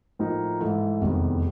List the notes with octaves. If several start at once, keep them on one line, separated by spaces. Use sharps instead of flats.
A2 F3 A#3 D#4
G#2 E3 A3
F1 E2 C3 D#3 G3